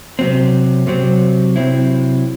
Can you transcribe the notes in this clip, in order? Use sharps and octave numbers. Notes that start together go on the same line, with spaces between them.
C3 F#3 C4
C3 F#3 C4
C3 F#3 C4 E4